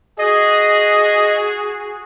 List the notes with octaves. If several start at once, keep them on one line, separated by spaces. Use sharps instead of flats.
F#4 G#4 D#5